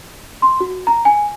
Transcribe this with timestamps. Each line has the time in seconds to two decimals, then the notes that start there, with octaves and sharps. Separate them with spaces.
0.42 C6
0.60 F#4
0.87 A#5
1.05 G#5